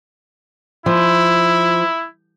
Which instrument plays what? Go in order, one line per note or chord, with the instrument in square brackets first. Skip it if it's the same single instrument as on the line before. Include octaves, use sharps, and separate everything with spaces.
[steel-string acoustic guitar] F3 [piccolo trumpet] E4